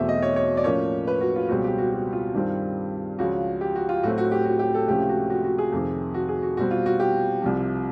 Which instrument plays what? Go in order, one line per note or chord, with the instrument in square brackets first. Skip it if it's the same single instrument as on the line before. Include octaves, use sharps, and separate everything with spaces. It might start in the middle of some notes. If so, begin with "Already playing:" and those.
Already playing: [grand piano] E2 B2 F#3 A3 C4 E5
D#5
C#5
C#5
D5
A2 F3 A#3 C#4 C#5
B4
F#4
F4
C#2 B2 G3 C4 F#4
G4
F#4
F#4
F4
G2 D#3 G3 C4
C#2 C#3 F3 F#4
G4
F#4
F4
A2 F#3 A3 C4 F#4
F#4
G4
F#4
G4
A4
C#2 C3 F3 A3 C#4 G4
F#4
F#4
F#4
G#4
F2 C3 D#3
F#4
G#4
F#4
B2 G3 C4 F#4
F4
F#4
G4
C2 C3 F3